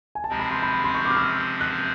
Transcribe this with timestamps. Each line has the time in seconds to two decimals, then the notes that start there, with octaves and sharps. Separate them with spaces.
0.15 G#5
0.24 A5
0.29 C3 F3 G#3 C4 A#5
0.39 B5
0.51 C6
0.62 B5
0.73 B5
0.84 C6
0.95 C#6
1.05 D6
1.11 F6
1.17 E6
1.61 F#6